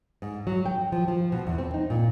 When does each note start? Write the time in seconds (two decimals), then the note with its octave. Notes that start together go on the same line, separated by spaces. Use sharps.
0.22 G#2
0.47 F#3
0.66 G5
0.92 F3
1.08 F3
1.32 B2
1.47 E2
1.58 C4
1.74 D#4
1.90 A#2